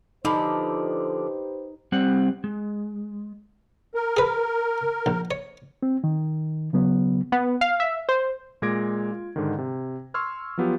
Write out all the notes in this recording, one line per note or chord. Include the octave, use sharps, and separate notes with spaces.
D3 F3 D#4 G4 B4 C5 B5
G3 C4 F#5
G#3
A#4
G#4 B4
A#1
C#5
C4
D#3
C#3 F#3 B3
B3
F5
E5
C5
A#2 G#3 D6 G#6 A#6 D7
F4
G#2 D3 D#3
C3
C6 C#6 E6 F6 G#6
F3 F#3 B3 F4 G4